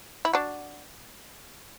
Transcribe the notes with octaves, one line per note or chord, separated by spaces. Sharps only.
E4
D4 F#4